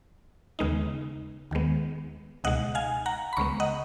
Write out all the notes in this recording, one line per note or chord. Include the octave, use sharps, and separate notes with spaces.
D#2 C#3 G#3 B3 D#4
D#2 D#3 G#3 B3
C#2 B2 G#3 D#4 D#5 F#5
F5 G#5
F#5 A#5
B5
C#2 C#3 G#3 B3 A#5 C#6
D#5 F#5